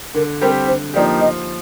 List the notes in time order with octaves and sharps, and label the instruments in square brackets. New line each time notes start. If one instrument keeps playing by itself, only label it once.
[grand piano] D3 [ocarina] A#4
[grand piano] G3 C4 G4 [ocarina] A#4
[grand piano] D3 [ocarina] C5
[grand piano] F3 A#3 D#4 G4 [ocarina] D5
[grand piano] F3 [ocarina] D#5